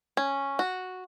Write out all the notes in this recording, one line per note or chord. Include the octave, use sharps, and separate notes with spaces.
C#4
F#4